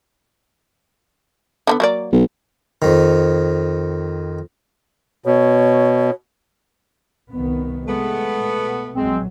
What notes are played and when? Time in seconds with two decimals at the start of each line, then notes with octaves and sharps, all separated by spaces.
1.67 D3 F3 B3
1.80 F#3 A#3 D5
2.13 B1
2.82 F2 D#3
5.26 B2 C#5
7.33 C2 D#3 B3
7.88 G#3 A3 B3
8.38 B2
8.95 A#1 E2 F#3 G#3 C4